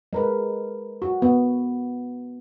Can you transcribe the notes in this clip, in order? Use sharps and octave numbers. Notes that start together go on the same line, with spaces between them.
G#3 A#4 B4
F#4
B3